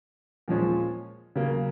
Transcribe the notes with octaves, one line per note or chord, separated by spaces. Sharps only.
A#2 F3 G#3 C#4
C#3 F#3 A#3